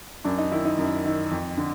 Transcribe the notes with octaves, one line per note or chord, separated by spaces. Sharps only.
F#2 D4
D#4
D#3 E4
D#4
F#2
D#3
F2
D3